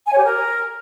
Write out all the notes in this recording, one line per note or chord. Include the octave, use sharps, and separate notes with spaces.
G#5
C#5
G4
A#4